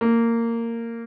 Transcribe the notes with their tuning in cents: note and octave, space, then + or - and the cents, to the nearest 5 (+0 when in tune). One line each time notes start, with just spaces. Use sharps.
A#3 -15